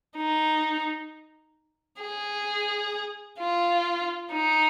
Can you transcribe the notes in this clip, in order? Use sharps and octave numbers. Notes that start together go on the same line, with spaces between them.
D#4
G#4
F4
D#4